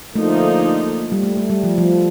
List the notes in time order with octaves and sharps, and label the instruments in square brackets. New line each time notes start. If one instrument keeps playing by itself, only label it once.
[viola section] D3 F3 A#3 D#4 [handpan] A3
[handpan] G3
A3
A3
G3
F3
F3